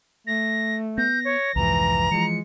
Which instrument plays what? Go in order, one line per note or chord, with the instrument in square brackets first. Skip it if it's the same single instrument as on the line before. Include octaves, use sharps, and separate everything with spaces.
[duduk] A3 [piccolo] A#6
[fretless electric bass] B3 [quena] G6 [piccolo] A#6
[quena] C#5
[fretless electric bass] C2 F2 G#2 [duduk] E3 [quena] A#5
[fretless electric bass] E3 F3 [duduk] G#3 [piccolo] C#7